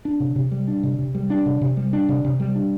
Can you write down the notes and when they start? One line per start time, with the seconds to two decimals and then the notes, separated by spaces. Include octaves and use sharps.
0.05 D4
0.20 C3
0.36 C3
0.51 G3
0.68 D4
0.83 C3
0.99 C3
1.15 G3
1.30 D4
1.46 C3
1.61 C3
1.77 G3
1.93 D4
2.09 C3
2.24 C3
2.40 G3
2.56 D4